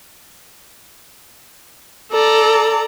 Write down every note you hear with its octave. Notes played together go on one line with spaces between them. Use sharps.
A4 D5 A#5